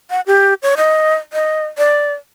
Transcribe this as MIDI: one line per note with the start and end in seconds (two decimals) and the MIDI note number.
0.10 0.21 78
0.27 0.54 67
0.63 0.74 73
0.77 1.15 75
1.33 1.64 75
1.78 2.13 74